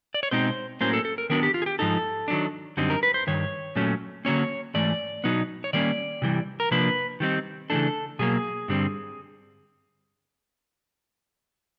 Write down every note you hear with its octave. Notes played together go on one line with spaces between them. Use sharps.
D5
C#5
B2 G#3 C4 D#4 C5
A2 F#3 A#3 C#4 C5
A4
A4
A#4
D#3 F#3 B3 D4 A#4
G4
F4
G#4
G4
G#2 F3 D#4 A4
D#3 F#3 B3 D4
F#2 D3 G3 C4 D#4
A#4
B4
C5
G2 D#3 C#5
A#2 F#3 A3 C#4
D3 F#3 A#3 C#4 C#5
G#2 E3 A3 D5
B2 F#3 B3 D#4
C#5
D#3 G3 A#3 C#4 D5
C3 E3 G3
A#4
C3 F3 A#3 D4 B4
D#3 G3 C4 D#4
C#3 E3 A3 D4 A4
B2 F#3 A#3 G#4
G2 D3 G3 C4